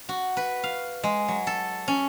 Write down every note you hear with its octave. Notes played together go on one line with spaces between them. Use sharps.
F#4
B4
F5
G#3
F#3
A4
C#4